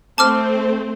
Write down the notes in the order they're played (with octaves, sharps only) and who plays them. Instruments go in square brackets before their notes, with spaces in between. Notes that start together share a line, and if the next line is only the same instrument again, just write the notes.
[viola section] A3 C4 C5 [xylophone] A5 D6 F6